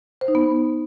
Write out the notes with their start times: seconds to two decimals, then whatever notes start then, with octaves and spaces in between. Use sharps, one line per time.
0.21 C5
0.28 D#4
0.35 B3